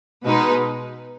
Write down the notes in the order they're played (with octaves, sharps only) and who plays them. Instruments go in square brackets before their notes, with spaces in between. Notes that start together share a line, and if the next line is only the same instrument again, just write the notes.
[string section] B2 G#3 D#4 B4